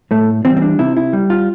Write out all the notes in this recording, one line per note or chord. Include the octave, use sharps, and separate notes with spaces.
A2 A3
E3 G3 C4
C4
D4
C3 E4
E4
G3
F4